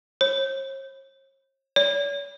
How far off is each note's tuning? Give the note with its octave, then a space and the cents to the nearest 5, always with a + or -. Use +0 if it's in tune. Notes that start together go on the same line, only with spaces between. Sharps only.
C#5 -45
C#5 +45